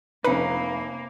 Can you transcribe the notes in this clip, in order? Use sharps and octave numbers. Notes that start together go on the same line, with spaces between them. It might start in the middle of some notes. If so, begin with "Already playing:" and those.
F1 A#3 C#4 D#4 B4 B5